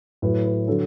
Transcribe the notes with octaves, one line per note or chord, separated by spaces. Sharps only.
A2 F#3 B4
B4
D3 F#3 A4